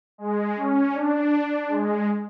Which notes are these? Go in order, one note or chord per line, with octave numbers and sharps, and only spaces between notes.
G#3
C#4
D4
G#3